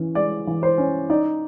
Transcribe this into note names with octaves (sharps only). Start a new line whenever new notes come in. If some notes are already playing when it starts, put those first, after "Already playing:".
Already playing: E3 C#4
G#3 D5
E3
C5
C#4
D#4 D5